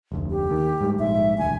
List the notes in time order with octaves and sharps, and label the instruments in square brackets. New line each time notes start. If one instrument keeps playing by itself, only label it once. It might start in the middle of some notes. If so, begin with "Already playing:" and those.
[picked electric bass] F1 D2
[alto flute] G4
[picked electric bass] D#2 D#3
G#2 G3
[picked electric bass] A#1 G#2 [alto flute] E5
[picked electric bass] E1 D2 [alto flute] G#5